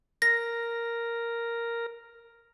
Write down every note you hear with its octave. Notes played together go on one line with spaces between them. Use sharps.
A#4 A#6